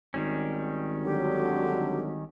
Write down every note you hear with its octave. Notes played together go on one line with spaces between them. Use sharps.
G#1 D#3 G3 C#4
D3 F#3 G4